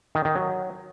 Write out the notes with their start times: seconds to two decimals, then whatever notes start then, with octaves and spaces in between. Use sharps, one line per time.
0.15 D#3
0.25 D#3
0.35 F#3